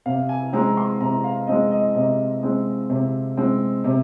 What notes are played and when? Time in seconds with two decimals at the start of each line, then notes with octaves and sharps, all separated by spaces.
0.06 C3 F5
0.29 G#5
0.53 G#3 C4 A#5
0.77 C6
1.01 C3 A#5
1.24 F5
1.47 G#3 C4 D#5
1.71 D#5
1.95 C3 D#5
2.43 G#3 C4
2.90 C3
3.37 G#3 C4
3.84 C3